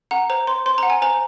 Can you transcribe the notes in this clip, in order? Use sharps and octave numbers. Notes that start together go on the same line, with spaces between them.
F#5 A#5
C5 A#5
C5 C6
C5 C6
F#5 A#5
G#5
C5 A#5